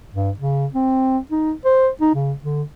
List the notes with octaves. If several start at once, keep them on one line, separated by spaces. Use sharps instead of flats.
G2
C#3
C4
D#4
C5
D#4
C#3
D3